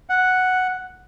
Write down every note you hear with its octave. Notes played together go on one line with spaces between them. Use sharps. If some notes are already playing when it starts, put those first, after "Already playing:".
F#5